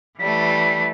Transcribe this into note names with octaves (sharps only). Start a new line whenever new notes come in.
E3 G3 A3 B6